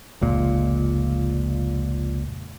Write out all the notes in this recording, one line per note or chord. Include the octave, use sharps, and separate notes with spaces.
F1 C#2 A#2